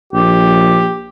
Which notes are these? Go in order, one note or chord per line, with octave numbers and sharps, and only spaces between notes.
A#1 G4